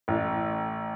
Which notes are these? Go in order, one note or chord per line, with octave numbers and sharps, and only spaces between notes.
A1